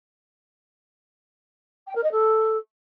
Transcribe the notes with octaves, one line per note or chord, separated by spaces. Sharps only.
G5
A#4
D#5
A4